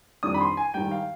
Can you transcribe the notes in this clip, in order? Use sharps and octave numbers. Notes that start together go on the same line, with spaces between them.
F2 D#3 G3 D4 D#6
B5
C6
G#5
G#2 D#3 G3 G5
F5